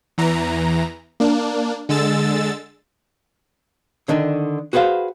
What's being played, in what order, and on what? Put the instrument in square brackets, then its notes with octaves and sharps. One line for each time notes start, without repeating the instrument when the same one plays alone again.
[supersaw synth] E2 E3 A#5
A#3 D4
D3 G#3 E6 A6
[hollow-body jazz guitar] D3 D#3 D4
F#4 G#4 B4 C5 F5